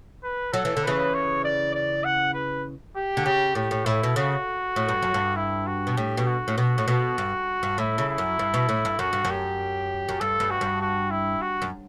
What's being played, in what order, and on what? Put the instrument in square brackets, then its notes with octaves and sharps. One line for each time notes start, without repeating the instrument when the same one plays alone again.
[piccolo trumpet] B4
[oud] F#3 [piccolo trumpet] A4
[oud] E3
D3
[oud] C#3 E3 [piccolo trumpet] B4
[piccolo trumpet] C#5
D5
D5
F#5
B4
G4
[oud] D3
[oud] C#3 [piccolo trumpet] G4
[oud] A2 [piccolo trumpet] G4
[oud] A2
[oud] A2 [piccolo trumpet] E4
[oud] B2
[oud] C#3 [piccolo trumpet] F#4
[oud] A2
G2
F#2
G2
[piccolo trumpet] E4
F#4
[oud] B2
[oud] A2 [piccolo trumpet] G4
[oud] B2
[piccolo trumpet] F#4
[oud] A2
[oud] B2 [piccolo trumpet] F#4
[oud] A2
B2
G2
G2
[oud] A2 [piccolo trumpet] E4
[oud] C#3
[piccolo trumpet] E4
[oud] F#2
G2
B2
A2
G2
[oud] F#2 [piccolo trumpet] F#4
[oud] G2
F#2
[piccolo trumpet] G4
[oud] F#2
[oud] G2 [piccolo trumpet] A4
[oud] G2
[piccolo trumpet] F#4
[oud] G2
[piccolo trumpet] F#4
E4
F#4
[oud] F#2